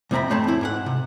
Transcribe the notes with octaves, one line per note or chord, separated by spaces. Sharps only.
C2 F2 C4 E5 A#5 B5
G#2 A3 C4 C#5 A5 B5
E2 E4
G#2 A#4 F#5
C3